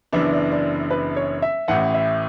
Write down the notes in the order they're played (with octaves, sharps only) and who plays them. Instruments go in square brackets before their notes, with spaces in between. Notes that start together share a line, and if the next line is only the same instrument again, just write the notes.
[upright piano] F#1 F#2 E3 B3 D4 [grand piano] E5
[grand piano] D5
D5
B4
C#5
E5
[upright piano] A1 A2 E3 [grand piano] F#5
[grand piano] E5